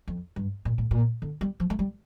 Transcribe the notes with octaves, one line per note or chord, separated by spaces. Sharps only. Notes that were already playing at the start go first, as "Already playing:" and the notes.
F2
G2
A#2
A2
A#2
D3
G3
F3
A3
G3